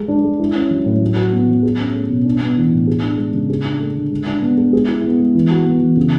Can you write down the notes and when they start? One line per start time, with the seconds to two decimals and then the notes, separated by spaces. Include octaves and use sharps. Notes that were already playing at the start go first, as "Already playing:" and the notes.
Already playing: G#3 G#4
0.08 D4
0.24 G#3
0.40 E4
0.55 C#4
0.71 F#3
0.86 A2
1.02 F#3
1.16 F#4
1.33 B3
1.49 F#3
1.63 G#4
1.79 C#4
1.94 A3
2.09 B2
2.25 D4
2.41 B3
2.57 E3
2.72 A2
2.87 G#4
3.03 D4
3.18 G#3
3.34 C#3
3.50 G#4
3.65 D4
3.80 A3
3.95 D3
4.11 G#3
4.27 D4
4.42 B3
4.57 G#3
4.73 G#4
4.88 E4
5.04 B3
5.20 G#3
5.35 E3
5.51 F#4
5.66 B3
5.81 E3
5.97 C#3